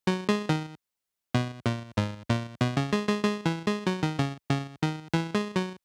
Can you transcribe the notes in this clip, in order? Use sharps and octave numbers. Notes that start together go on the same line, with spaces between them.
F#3
G#3
D#3
B2
A#2
G#2
A#2
B2
C#3
G#3
G#3
G#3
E3
G#3
F#3
D#3
C#3
C#3
D#3
E3
G#3
F#3